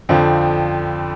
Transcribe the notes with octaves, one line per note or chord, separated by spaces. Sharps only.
F2 D3 F3 C4